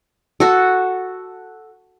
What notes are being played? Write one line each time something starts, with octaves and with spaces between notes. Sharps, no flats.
F#4 A4